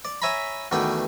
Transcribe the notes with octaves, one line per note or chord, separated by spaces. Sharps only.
D5
C#5 E5 G#5 A#5 B5
E2 B2 D#3 A3 D5 G5